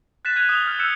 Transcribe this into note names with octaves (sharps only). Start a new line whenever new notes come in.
F#6 A6 B6 E7
F6 F#6 G#6 D#7 F7
D#6 F6 E7 F7 G7
F6 G6
E6 F#6 G6 C#7 E7